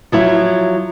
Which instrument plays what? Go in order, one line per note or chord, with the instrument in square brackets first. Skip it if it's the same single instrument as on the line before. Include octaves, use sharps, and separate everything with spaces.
[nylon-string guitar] F3 F#3 E4